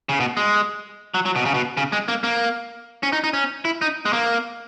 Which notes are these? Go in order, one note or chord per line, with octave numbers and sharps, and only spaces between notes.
C#3
B2
G#3
F#3
F#3
B2
C#3
B2
C#3
G#3
A#3
A#3
C#4
D#4
D#4
C#4
E4
D#4
G#3
A#3